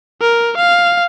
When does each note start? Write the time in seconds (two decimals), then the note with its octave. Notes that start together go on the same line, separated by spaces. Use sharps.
0.21 A#4
0.58 F5